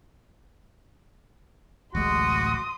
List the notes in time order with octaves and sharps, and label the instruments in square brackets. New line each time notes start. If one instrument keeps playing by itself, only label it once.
[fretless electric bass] D1 A1 G#3 [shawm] F#4 [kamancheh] C6 D#6